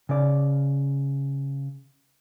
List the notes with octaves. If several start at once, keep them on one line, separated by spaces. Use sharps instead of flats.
C#3 D5